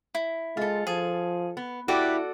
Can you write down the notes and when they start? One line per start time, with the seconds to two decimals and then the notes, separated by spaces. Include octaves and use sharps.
0.15 E4
0.57 G#3 F4 A4
0.87 F3 G#4
1.57 B3
1.88 E4 F#4 G4 A4 B4 D5